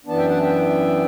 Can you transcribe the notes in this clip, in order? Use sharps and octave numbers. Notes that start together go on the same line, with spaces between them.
F#2 E3 B3 D4 A5
E5 G5
F#5 A5
E5 G5